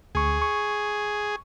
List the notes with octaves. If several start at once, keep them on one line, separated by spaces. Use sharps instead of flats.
D2 G#4 C#6
C#6